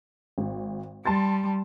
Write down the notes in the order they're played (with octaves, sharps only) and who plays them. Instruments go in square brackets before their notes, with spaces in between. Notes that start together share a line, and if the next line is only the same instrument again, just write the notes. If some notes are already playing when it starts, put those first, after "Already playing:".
[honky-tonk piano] G#1
[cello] G3 [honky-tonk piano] A5 C6 A6